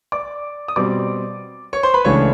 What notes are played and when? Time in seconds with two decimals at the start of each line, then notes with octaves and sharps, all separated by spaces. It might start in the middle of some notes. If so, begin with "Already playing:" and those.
0.12 D5 D6
0.68 D#6
0.76 B2 G3 C4 D5 D6
1.73 C#5 C#6
1.83 C5 C6
1.94 B4 B5
2.05 C#2 C#3 E3 A3 D4 C#5 C#6